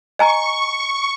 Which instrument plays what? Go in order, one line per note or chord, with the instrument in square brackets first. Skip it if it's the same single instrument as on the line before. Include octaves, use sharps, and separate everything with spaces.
[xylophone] D#5 G#5 A#5 [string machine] C#6